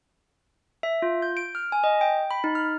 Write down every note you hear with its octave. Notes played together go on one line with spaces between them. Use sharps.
E5
F4
G6
D7
F6
G#5
D#5
G5
B5
D#4
F6